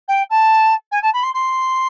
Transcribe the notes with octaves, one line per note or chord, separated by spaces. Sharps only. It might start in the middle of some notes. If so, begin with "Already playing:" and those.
G5
A5
G#5
A5
B5
C6
C6